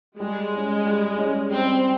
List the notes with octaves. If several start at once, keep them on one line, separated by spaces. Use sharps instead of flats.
G3 G#3
C#4 G#4 D#5
G3
C#4 G#4 D#5
G3 C4